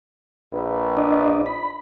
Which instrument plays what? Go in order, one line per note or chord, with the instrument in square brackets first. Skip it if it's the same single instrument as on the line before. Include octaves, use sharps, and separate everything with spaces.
[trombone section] A#1 B4
[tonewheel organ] D4 D5 D#5
B5